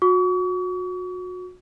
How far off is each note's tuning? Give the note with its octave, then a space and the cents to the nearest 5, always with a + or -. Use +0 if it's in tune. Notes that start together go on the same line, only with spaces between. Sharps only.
F#4 -30 C#6 +40